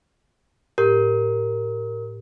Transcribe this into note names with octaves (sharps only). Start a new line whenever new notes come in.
A2 G4 A#4